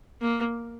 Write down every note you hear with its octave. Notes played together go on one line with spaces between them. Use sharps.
A#3